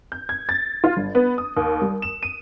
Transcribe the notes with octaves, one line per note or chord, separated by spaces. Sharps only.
G6
G#6
A6
F4
G1
B3
D#6
D#2
G3
E7
D#7